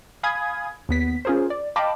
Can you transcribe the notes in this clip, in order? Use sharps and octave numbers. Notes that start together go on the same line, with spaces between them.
F5 G#5 B5 D#6 G#6
D#2 B3 B6
C#4 F4 G#4 A#4 C5
D5
D#5 F5 G5 A5 B5 D6